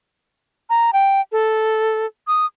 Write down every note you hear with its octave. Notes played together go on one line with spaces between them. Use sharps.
A#5
G5
A4
D#6